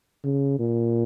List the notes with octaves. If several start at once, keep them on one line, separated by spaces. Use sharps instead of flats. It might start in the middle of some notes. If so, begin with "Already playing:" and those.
C#3
A#2